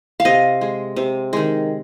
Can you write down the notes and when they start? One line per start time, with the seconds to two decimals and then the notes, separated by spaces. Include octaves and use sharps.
0.20 F5
0.25 C3 D#5
0.61 G#3
0.96 C3
1.33 D#3 G#3